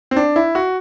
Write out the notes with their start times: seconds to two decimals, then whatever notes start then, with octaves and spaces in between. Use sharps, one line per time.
0.11 C4
0.16 D4
0.36 E4
0.55 F#4